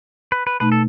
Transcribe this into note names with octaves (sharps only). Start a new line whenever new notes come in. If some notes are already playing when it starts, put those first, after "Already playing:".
B4
B4
B2 A3 D#4 B4
A4